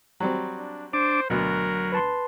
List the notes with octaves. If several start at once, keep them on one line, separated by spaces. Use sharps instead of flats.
F#3 G3 C4
D4
D4 C5 D6
D2 B2 F#3 A#4
B4 A5 C6